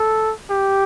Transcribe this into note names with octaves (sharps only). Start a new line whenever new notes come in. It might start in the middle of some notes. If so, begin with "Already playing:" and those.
Already playing: A4
G4